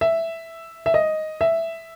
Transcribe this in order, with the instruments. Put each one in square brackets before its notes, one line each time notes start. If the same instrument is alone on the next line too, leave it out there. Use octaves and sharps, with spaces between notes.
[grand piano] E5
E5
D#5
E5